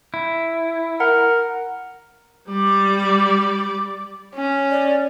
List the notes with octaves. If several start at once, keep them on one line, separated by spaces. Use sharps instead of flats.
E4
A#4 F#5
G3 D5
C#4
D5